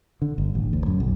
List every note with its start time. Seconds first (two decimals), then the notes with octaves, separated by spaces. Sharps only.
0.22 D3
0.38 G1
0.55 A1
0.73 D2
0.86 F#2
1.00 B1